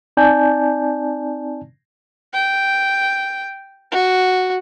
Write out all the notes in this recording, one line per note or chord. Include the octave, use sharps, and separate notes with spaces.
C4 D#4 D5 G#5 A5 G6
G5
F#4